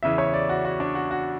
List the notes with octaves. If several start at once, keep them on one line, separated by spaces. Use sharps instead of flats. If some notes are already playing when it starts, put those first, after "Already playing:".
E2 C#3 E3 E5
C#5
D5
F#4
F#4
D4
F#4
F#4